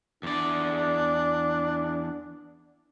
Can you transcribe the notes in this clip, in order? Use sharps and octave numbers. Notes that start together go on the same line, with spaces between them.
E2 D4 D5